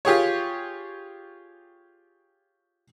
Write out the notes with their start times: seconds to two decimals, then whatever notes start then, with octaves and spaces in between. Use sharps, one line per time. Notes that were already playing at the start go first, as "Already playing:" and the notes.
0.05 F4 G4 G#4 C#5